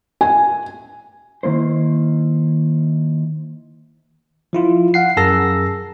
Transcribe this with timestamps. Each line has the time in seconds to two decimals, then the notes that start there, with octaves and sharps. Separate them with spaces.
0.21 G#5
1.43 D#3 A#3 E4 C5
4.53 F3 E4 F4
4.94 F5 F#5 C7
5.17 F#2 G#4 A#4 A5 E6 A#6